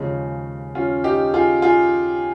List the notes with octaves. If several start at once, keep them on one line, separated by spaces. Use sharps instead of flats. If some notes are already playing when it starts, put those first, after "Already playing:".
Already playing: D#2 C#3 F3 G#3 C#4
C#4 F4
D#4 G4
F4 G#4
F4 G#4